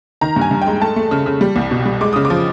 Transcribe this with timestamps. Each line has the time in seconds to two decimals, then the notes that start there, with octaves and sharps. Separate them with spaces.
0.21 D#3 A#5
0.36 G2
0.41 G#5
0.51 G2
0.62 G5
0.67 G#3
0.81 A3 A5
0.96 A3
1.11 C#3
1.26 C#3
1.41 G3
1.56 C2
1.71 B2
1.86 G3
2.01 G#3 D6
2.13 C#3 D#6
2.25 D6
2.30 F3